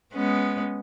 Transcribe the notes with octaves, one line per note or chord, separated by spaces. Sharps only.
G#3 B3 C#4